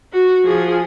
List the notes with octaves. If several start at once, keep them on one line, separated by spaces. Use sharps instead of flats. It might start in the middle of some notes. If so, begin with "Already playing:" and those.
F#4
F3 G#4